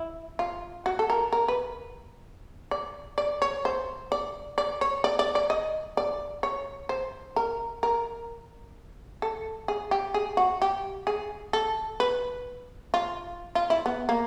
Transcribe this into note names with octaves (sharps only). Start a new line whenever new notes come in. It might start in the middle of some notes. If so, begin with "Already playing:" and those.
Already playing: E4
F4
F#4
A4
A#4
A#4
B4
D5
D5
C#5
C5
D5
D5
C#5
D5
D5
D5
D#5
D5
C#5
C5
A#4
A#4
A4
G#4
G4
G#4
F#4
G4
G#4
A4
B4
F4
F4
E4
B3
A#3